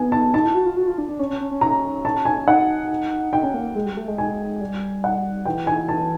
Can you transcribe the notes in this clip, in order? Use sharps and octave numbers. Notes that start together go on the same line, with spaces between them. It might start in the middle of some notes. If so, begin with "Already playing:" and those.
Already playing: B3 G#5
A5
D#4 A5
E4
F#4
F4
F#4
F4
D4
D4
C#4
C#4
C#4
C#4
A#5
A5
G#5
D#4 F#5
D#4 G5
C#4
A#3
G#3
G3
A3
G#3
G#5
G3
F#5
E3 G5
G#5
A5